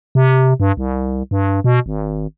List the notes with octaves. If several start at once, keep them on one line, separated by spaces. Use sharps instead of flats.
C3
G2
C2
G2
B2
G#1